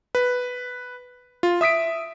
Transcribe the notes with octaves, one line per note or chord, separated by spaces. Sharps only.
B4
F4
E5 D#6 B6 D7